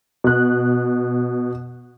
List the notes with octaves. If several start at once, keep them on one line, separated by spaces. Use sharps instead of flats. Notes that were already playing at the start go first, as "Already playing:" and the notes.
B2 F#6